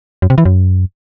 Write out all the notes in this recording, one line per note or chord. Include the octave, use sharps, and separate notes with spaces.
F#2
C3
E3
F#2